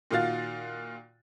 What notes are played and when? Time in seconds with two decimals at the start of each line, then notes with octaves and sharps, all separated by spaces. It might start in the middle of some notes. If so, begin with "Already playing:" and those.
0.11 A#2 D#3 F4 F#4 F5 A6